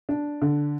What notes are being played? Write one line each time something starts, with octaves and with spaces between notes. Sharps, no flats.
D4
D3